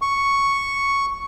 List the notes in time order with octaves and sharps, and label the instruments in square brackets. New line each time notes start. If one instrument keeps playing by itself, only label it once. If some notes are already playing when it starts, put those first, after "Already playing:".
[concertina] C#6